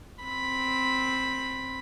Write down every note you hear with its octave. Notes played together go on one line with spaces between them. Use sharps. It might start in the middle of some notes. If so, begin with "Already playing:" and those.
C4 B5